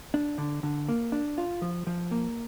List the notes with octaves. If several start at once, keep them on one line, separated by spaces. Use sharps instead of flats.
D4
D3
D3
A#3
D4
F4
F3
F3
A#3